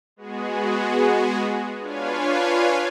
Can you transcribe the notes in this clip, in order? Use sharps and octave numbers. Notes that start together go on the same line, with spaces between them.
G#3 B3 F#4 G#4
D4 F4 B4 C#5 F5 G#5